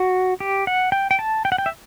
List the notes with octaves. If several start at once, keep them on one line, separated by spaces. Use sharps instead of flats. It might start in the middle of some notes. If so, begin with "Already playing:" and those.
Already playing: F#4
G4
F#5
G5
G5
A5
G5
F#5
G5
E5